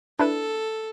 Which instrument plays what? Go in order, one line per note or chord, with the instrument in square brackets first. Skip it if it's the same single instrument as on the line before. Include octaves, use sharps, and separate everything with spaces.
[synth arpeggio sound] D4 E4 B4 [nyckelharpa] A4